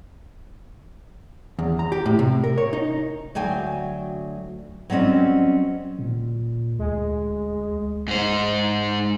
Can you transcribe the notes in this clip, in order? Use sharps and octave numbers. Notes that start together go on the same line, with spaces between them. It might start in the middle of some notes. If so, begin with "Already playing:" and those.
E2
A#5
G4
A2
C3
A#4
C#5
D#4
D2 F#3 G5 G#5
F#3 G3 C4 C#4 D#5
A#2
D2 G#3
G#2 C5